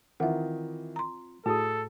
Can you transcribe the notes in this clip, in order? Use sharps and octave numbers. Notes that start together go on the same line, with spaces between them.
D#3 E3 C4 F4 E5 F#5
A#5 C6
A2 F#4 G#4 A4 A5 D#6